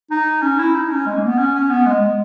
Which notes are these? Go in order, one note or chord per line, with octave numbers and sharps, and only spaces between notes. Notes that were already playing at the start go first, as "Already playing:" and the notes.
D#4
C#4
E4
D#4
C#4
G#3
A#3
B3
C#4
C#4
B3
G#3
G#3